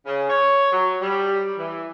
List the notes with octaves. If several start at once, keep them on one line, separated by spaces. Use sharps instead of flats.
C#3
C#5
F#3
G3
E3